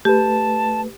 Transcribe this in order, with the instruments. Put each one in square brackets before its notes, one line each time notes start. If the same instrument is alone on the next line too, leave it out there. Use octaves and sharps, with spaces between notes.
[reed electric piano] A3 B4 [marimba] G4 [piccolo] A5